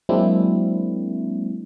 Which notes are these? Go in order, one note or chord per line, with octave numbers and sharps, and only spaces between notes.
F#3 G#3 A#3 C4 D4 E4